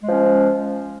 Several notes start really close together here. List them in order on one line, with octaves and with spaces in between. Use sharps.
G#3 F3 C#4